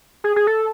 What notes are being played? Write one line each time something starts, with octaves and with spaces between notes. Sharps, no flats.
G#4
G#4
A4